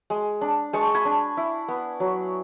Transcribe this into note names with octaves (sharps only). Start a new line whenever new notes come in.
G#3
D4
G#3 A5 C#6
G#5 B5
D4
E4
B3
F#3